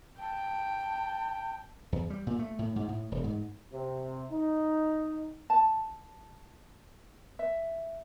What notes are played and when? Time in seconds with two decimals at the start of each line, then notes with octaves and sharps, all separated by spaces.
0.20 G5 A5
1.92 E2
2.10 G3
2.27 A#2
2.39 A3
2.59 A2
2.76 G#2
2.88 A2
3.12 E1
3.24 G#2
3.73 C3
4.31 D#4
5.50 A5
7.39 E5